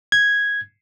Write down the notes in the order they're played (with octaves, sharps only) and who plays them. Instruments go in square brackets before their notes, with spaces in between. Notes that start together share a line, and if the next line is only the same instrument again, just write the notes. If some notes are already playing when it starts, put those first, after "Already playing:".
[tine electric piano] G#6